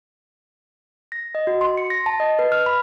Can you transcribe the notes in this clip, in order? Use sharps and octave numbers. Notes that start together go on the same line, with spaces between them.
A#6
D#5
F#4
C6
C#7
A#6
A5
D#5
B4
F6
B5